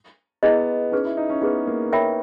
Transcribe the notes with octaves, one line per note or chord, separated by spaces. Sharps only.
B3 E4 G#4 D#5
C#4 D#4 G#4 B4
E4
D#4
C#4
B3 D#4 G#4 B4
A#3
A#4 C#5 E5 G5 B5